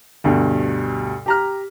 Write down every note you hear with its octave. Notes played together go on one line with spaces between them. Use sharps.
D2 G2 B2
G4 A#5 F6